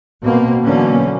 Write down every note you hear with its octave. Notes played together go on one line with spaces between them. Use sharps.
B2 A#3 C4
B2 D3 E3 F#3 A#3 C#4